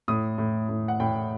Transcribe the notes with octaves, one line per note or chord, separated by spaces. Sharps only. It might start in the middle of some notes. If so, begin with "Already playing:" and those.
A2 D#6
A2
A2
F#5
A2 G5